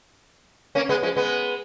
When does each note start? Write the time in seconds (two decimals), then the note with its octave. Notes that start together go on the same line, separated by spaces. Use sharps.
0.75 A#3 C#4
0.89 G#3 B3
1.03 F3 G#3
1.16 G#3 B3